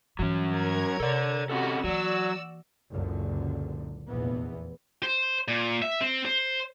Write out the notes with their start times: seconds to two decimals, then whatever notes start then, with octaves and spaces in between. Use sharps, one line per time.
0.19 G2 E3 F#3 C#4
0.54 A#4 C#5 G#6
1.00 C3 A4 D5
1.49 C4 C#4 F#4 G4 A4
1.84 E3 F#3 A#3 F#4 D5 E6
2.90 F#1 C#2 F#2 A#2 D3
4.08 F1 A#1 E2 E3 B3
5.03 C5
5.48 A#2
5.82 E5
6.01 C4
6.25 C5